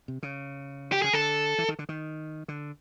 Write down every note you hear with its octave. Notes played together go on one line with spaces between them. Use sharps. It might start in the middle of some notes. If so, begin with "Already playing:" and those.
C3
C#3
G4
C#3 G#4
D3 A4
E3
D#3
D3
D#3
D3